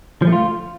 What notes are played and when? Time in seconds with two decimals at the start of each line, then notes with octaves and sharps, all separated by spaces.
0.22 F3
0.27 A3
0.33 F4